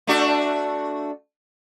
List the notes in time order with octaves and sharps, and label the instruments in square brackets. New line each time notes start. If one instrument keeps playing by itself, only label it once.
[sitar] A3 D4 F#4